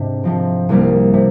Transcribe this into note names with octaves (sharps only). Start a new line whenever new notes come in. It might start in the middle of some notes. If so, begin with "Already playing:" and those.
Already playing: G#2 C3 D4
C3 F3 C4
C2 C3 G3 A#3
C3